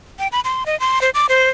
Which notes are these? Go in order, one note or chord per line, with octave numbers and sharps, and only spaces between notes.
G5
B5
C6
D#5
C6
C5
D6
C5